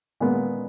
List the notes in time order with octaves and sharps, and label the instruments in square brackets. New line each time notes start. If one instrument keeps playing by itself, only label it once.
[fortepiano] A#2 G#3 B3